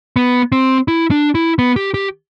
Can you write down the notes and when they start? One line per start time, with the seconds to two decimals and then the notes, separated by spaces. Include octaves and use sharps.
0.16 B3
0.52 C4
0.88 E4
1.11 D4
1.35 E4
1.59 B3
1.76 G4
1.94 G4